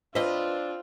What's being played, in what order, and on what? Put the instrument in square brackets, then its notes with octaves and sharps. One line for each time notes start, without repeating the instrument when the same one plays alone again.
[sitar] C4 [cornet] D4 [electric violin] F4 [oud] B4 D#5